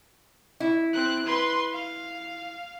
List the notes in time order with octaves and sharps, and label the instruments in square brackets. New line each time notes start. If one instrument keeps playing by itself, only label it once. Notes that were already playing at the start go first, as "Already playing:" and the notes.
[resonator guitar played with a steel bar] E4
[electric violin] C4 F#6
B4 C6
F5